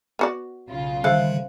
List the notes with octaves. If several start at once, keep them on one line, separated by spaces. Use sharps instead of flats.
B3 F#4 D5
B1 C#3 F4
D3 D#3 G3 A4 C5 E5 F5 F#6